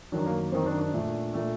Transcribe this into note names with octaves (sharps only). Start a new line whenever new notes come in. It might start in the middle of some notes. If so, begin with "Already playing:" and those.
F#2 D#3 F#3 D4
A#3
A#3
F#2 D#3 F#3 C4
D4
D4
A#2 A3
A#2 A3